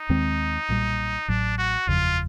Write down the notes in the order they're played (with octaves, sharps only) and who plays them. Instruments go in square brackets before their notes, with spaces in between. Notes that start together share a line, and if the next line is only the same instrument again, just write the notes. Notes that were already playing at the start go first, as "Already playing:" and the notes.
Already playing: [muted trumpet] D#4
[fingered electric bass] D#2 D#3 G#3 C4
B1 A#2 G3
[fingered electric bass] A1 A2 F#3 [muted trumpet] D4
[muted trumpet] F#4
[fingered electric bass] F#1 E2 C#3 F3 [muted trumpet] F4